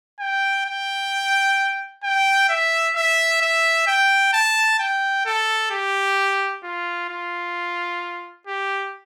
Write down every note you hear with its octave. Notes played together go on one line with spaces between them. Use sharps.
G5
G5
G5
E5
E5
E5
G5
A5
G5
A4
G4
F4
F4
G4